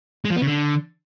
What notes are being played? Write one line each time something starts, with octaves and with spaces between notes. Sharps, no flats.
G#3
F3
B3
C#3
D3